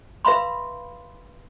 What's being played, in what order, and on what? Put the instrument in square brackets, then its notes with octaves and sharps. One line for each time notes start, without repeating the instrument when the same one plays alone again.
[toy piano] B4 E5 F5 B5 C6